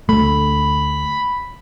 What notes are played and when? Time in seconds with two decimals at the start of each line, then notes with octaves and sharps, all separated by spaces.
0.09 D2 A3 B5